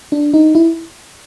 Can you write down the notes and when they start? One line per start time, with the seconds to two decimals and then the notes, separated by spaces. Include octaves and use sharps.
0.12 D4
0.34 D#4
0.55 E4